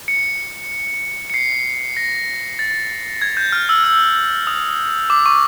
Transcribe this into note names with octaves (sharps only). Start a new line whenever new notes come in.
C#7
C#7
C7
A#6
A6
G#6
G6
F6
E6
E6
D#6
D6
C#6